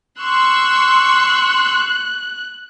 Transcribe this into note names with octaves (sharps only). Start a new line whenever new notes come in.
C6 C#6 E6 F#6